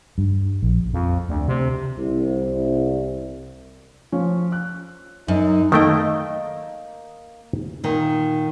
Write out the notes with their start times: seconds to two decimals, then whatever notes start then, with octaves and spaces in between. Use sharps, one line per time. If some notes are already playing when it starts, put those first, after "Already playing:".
0.18 G2
0.63 A#1
0.93 F2
1.29 D2
1.48 C3
1.98 C2
4.12 F3 C#4
4.52 F#6
5.28 F#2 D#4
5.72 D#3 A3 A#3 D#5 G5
7.84 A#2 D#3